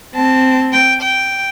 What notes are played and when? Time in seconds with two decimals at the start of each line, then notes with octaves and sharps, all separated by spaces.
0.15 C4 A5
0.73 G5
1.02 G5